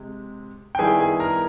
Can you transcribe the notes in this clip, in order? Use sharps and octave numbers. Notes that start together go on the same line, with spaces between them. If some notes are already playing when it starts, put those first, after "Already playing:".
Already playing: C3 G#3
G5
D#3 G3 B3 E4 G#4 G#5
G#4 G#5
A#4 A#5